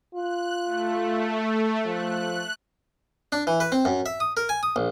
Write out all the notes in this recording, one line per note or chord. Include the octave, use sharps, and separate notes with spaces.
F4 F#6
A3
F3 F#6
D4
E3
B4
C4
F#2
E5
D#6
A#4
G#5
D#6
A#1